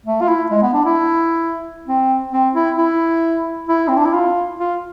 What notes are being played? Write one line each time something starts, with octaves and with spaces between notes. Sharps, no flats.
A3
F4
E4
G#3
B3
D4
E4
C4
C4
E4
E4
E4
C4
D4
E4
F4
F4